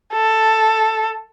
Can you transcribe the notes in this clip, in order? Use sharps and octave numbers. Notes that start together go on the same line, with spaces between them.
A4